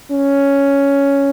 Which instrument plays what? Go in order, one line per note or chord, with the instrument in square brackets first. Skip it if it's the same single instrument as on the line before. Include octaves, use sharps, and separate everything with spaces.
[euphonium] C#4